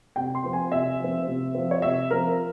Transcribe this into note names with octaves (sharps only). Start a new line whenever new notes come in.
C3 G5
C6
F3 C4
G#5
C3 E5
F3 C4
C3
F3 C4
C#5
C3 E5
F3 C4 A#4